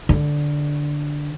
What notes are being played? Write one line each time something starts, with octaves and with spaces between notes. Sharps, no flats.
D3